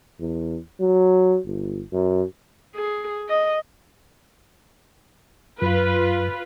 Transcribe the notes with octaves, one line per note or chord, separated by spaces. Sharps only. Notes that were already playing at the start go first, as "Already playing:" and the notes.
E2
F#3
G1
F#2
G#4
D#5
F#2 F4 B4